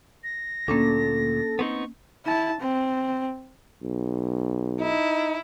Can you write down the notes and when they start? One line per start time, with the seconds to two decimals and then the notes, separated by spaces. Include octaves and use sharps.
0.24 A#6
0.68 D2 A#2 A#3 C#4 D4 A4
1.59 B3 C4 D#4 C#6
2.26 E4 A5
2.61 C4
3.83 B1
4.81 D#4 E4